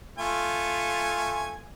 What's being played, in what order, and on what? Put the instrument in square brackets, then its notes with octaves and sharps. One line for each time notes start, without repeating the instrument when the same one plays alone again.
[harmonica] A3 F4 G#5